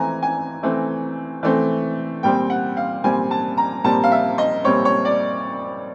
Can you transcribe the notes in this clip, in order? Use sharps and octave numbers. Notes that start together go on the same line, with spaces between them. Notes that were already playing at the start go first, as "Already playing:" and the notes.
Already playing: E3 A3 C4 G#5 A#5
G#5
E3 A3 C4
E3 A3 C4
A#2 G3 C4 G5
F#5
F5
A#2 G3 C4 G#5
A5
A#5
A#2 G3 C4 A5
F5
E5
D#5
A#2 G3 C4 C#5
C#5
D5